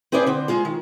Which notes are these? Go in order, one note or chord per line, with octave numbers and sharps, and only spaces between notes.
C4 G#4 B4 C5 D5
D3 C4
G#3 F4 G#4
D#3